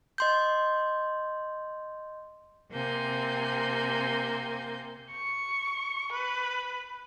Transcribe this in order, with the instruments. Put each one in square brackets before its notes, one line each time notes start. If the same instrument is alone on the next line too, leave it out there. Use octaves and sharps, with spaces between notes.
[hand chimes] D#5 C6 G6
[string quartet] C3 A#3 C4 G#5 G6
[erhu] C#6
B4